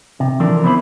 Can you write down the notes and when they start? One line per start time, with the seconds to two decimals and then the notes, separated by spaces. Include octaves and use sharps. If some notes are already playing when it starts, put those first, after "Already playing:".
0.20 C3
0.40 D3 E3 F3 D4 A#4
0.64 B3 C4 E4 C5 C#5 B5